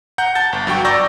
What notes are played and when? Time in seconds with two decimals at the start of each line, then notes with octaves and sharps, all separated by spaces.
0.18 F#5 A#5 G6
0.35 A5 G6 A6
0.53 G1
0.67 G2 F#3 G5 C#6
0.85 D5 A#5 C#6 E6 G6 A#6